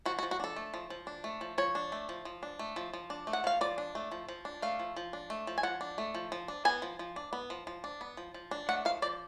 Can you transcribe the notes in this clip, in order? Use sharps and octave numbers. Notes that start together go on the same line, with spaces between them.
F3 F#4
F#4
F3
F#4
D4 A4
A3
F3
F3
D4
A3
F3
F3 C#5
D4
A3
F3
F3
D4
A3
F3
F3
D4
A3
F#5
F3 F5
F3 D5
D4
A3
F3
F3
D4
A3 F5
F3
F3
D4
A3
F3
G#5
F3 F#5
D4
A3
F3
F3
D4
B3 G#5
F3
F3
D4
B3
F3
F3
D4
B3
F3
F3
D4
A3 F#5
F3 F5
F3 D5